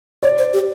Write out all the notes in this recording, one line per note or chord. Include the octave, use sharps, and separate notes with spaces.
C#5 D5
C5
G4